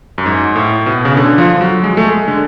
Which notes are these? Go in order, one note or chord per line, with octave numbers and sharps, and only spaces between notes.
F#2
G#2
A2
B2
C#3
D3
F3
F#3
G#3
A3
G#3
D3